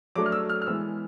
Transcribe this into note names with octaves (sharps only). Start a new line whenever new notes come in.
F#3 A3 D4 D6
F6
E6
F6
F6
E3 G#3 B3 E6